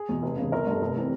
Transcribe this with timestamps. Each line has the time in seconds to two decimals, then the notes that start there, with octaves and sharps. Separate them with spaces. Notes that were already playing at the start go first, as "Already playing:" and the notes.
Already playing: G#4
0.09 E2 B2
0.22 F1
0.37 E2 C#3
0.52 G1 A#4
0.66 G2 D3
0.82 F1
0.96 C3 E3